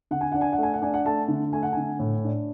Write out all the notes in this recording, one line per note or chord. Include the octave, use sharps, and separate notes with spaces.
D3 F#5
G#5
D4 F#5
G#5
F#5
A3
G#5
F#5
D4 G#5
F#5
A3 A5
D3
A3 G#5
F#5
D3 G#5
A2
D4